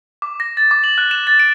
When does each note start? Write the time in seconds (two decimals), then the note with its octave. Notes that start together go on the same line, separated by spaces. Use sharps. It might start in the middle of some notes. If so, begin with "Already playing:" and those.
0.22 D6
0.40 A#6
0.57 A6
0.71 D6
0.84 F#7
0.98 F#6
1.11 E7
1.27 A6
1.40 D7